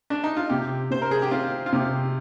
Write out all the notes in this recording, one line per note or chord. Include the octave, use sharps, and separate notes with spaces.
D4
D#4
F4
C3 G4
C3 C5
A#4
G#4
G4
C4 F4
F4
C3 G4